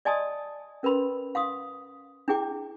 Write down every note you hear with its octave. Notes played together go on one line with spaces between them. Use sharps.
D5 D#5 G#5 A5 C6 D#6
C#4 A#4 B4 B5 C6
F5 C6 D#6
D4 E4 G#4 G5 D6